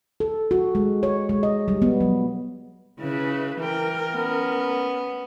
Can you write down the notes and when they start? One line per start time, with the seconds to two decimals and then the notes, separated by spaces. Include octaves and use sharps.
0.20 A4
0.51 F#4
0.75 G#3
1.03 C#5
1.29 G#3
1.43 D#5
1.68 G3
1.82 B3
2.01 F#3
3.01 C#3 E4 B4
3.59 E3 A#4 G5
4.15 B3 C#4